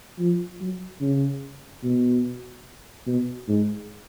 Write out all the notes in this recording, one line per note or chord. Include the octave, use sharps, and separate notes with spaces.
F3
F#3
C#3
B2
B2
G#2